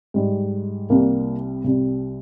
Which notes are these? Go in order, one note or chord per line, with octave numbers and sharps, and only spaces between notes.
G#2 G3
C2 C3 G3 A#3
C2 C3 G3